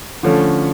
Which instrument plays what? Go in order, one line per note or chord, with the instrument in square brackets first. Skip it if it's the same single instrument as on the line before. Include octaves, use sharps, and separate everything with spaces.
[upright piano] D3 F3 A3 C#4